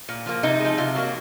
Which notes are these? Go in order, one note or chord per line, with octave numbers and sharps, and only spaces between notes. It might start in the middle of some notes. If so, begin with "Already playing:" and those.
A#2
F3 A#3
C3 D#4
F3 G#3
C3 F4
F#3 A#3